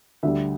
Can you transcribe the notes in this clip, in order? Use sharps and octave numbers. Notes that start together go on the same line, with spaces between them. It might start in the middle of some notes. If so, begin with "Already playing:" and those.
D2 D3 G3 E5